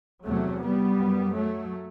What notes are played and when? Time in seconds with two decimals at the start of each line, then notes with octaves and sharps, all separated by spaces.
0.24 E2 C3 F#3 A3
0.61 G3 B3
0.98 F#2
1.34 F#3 A3